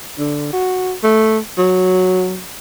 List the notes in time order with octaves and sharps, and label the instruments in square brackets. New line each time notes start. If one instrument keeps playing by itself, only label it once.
[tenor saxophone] D3
F#4
A3
F#3